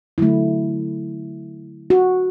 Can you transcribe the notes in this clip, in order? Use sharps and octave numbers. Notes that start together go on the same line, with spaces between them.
D3 F#3 A3 E4
F#4